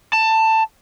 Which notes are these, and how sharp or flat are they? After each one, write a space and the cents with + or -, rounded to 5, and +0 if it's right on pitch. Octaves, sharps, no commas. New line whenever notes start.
A5 +15